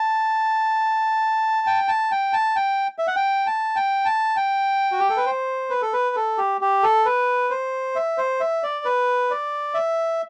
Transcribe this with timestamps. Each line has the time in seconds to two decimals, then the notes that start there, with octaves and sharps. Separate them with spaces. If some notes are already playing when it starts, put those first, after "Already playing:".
Already playing: A5
1.67 G5
1.88 A5
2.11 G5
2.33 A5
2.56 G5
2.98 E5
3.07 F#5
3.16 G5
3.47 A5
3.76 G5
4.05 A5
4.36 G5
4.92 F#4
5.00 G4
5.10 A4
5.17 B4
5.26 C5
5.70 B4
5.82 A4
5.93 B4
6.16 A4
6.38 G4
6.61 G4
6.83 A4
7.06 B4
7.50 C5
7.96 E5
8.18 C5
8.40 E5
8.63 D5
8.85 B4
9.31 D5
9.74 E5